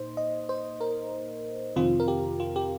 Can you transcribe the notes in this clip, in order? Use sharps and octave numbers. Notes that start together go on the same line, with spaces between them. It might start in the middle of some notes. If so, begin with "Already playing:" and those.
Already playing: A#2 A#3 D#4 C5
D#5
C5
A#4
F2 C3 D#3 C4 F4
A#4
G4
F4
G4